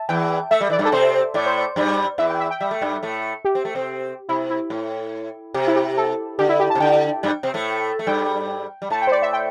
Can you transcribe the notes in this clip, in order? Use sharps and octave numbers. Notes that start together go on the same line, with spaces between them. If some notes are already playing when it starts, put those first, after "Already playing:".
Already playing: E5 A5
E2 E3 G5
A3 E5
G3
E3 D5
G2 G3
A4
C3 C4 C5
A2 A3 D5
C5
D5
G2 G3
E2 E3 E5
G5
E5
G5
G3 E5
A3
G2 G3
A2 A3
G4
C4
A3
C3 C4
C3 E4
E4
A2
C3 G4
E4
G4
A4
D3 G4
E4
G4
A5
C3
D3 G5
G2 G3
C3 C4
A2 A3
A3
G2 G3 G5
G3
A2 A3 A5
G5
C5
D5
E5
G5